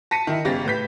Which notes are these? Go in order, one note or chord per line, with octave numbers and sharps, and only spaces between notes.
A5 A#6 B6 C#7 D#7
D#3 E4
G1 C#3 G4 A6 A#6
A2 B4 G6 B6